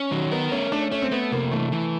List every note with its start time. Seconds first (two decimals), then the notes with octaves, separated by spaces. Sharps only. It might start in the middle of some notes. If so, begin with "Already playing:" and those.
Already playing: C#4
0.11 D#3 F#3
0.31 B3 A#4
0.51 A3 C#4
0.72 A3 D4
0.81 C#4
0.92 A3 C#4
1.02 C4
1.11 A3 B3
1.32 C3 A#3
1.52 E3 A3
1.72 E3